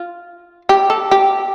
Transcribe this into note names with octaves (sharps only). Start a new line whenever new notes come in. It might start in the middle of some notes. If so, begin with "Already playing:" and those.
Already playing: F4
G4
A4
G4